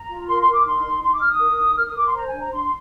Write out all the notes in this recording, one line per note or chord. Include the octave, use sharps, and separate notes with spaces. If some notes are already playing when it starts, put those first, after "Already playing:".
Already playing: A#5
F4
A#4 C6
C6
A#4
D6
D#4 C6
D#4
D#4 C6
D6
D#4 F6
D#6
A#4
D#4
A#4 F6
D#6
A#4 D6
C6
C5 A#5
G#5
D4
A#5
D4 C6